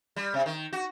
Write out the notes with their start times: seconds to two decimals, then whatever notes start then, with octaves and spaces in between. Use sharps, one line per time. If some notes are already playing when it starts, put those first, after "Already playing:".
0.16 G3
0.34 C3
0.46 D#3
0.73 F#4